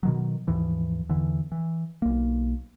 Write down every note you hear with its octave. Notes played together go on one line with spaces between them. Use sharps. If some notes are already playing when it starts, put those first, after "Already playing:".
B2 D#3 F#3
D#2 G#2 E3 F3
E2 D3 E3
E3
B1 A#3